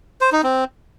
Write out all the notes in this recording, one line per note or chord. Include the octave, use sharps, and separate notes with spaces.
C5
D#4
C4